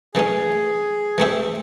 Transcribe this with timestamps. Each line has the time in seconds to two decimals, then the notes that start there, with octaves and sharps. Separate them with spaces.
0.14 C#3 E3 A3 C#4 G#4
1.18 E3 A3 C4 E4 G4